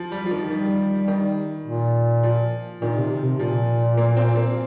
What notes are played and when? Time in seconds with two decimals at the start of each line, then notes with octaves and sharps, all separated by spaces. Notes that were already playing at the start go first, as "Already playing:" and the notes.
Already playing: F3
0.12 G3
0.26 F3
0.31 D#3
0.50 D#3 G3
1.08 D#3
1.67 A#2
2.23 F3
2.81 A#2 D#3
2.97 C3
3.11 C3
3.25 C3
3.39 A#2 F3
3.98 A#3
4.17 C4
4.36 A#3